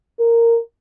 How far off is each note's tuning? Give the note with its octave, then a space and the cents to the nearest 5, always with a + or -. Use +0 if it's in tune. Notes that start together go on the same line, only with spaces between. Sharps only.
A#4 -10